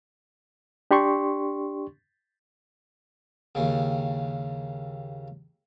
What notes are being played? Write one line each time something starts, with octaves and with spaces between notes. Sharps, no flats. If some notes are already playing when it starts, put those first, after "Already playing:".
D4 G4 D5 C6 C#6
D#2 C#3